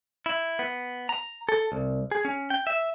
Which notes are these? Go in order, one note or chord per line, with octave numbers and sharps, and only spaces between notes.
E4
B3
A#5
A4
C2
G#4
C#4
G5
E5